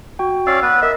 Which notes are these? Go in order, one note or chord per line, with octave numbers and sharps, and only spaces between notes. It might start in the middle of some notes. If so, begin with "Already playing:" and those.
F#4 G5
C#4 D5 F5 E6
B3 B4
A#4 D#5 E5